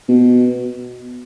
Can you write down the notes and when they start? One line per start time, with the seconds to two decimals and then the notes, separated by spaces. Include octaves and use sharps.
0.09 B2